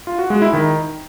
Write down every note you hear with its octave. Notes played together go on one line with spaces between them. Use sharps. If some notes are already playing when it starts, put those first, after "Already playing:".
F4
F#4
G#3
E4
D#3